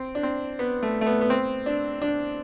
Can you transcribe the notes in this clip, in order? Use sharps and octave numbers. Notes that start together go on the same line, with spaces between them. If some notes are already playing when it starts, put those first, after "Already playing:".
Already playing: C4
D4
C4
B3
A3
A3
B3
B3
C4
D4
D4